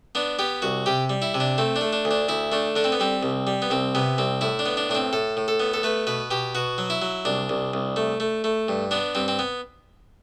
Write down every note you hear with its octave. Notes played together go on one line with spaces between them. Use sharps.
B3 D4
B3 G4
C2 F#4
C3 G4
G3
E4
C3
D4
A3 C4
D4
A3
D4
D2
D4
D2 E4
A3 D4
D3 D4
C4
B3
G3 C4
C2
G3
B3
C2 C4
C3 B3
C2 C4
A2 E4
D4
B3
D4
A2 D4
C4
A2 A4
A2
A4
B3
A4
A3 B4
B2 B4
B2 G4
B2 F#4
F#3
E4
F#3
C2 D4
C2
C2
A3
A3
A3
G2
B3 D4
G2 C4
C4
B3